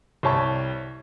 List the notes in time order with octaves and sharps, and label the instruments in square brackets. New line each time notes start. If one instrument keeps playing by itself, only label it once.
[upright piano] C2 G3 C#5 A5 C#6